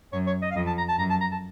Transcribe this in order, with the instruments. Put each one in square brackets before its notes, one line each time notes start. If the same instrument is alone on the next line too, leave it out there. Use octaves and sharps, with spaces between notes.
[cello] F#2 [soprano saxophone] C#5
[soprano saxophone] C#5
D#5
F5
[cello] F2 [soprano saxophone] D#5
[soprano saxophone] A5
A#5
A5
[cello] F#2 [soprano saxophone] A#5
[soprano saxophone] A5
A#5
A5